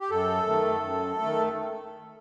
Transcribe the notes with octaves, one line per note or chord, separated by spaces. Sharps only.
G4
F#2 A4
D#3 A3
F#2
D#3 A3